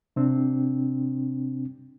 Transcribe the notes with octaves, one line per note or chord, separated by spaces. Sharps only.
C3 C4 D4